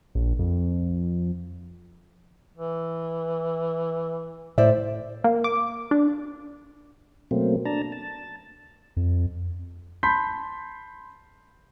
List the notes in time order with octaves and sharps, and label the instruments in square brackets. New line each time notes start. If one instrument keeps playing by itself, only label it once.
[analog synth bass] A#1
F2
[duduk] E3
[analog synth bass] A2 [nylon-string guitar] C5 D5 E5
[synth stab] A#3
D6
D4
[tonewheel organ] B2 F#3 A3 A#3 C4
D4 A5 A#5
A5
[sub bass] F2
[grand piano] A5 B5 C6 G6 B6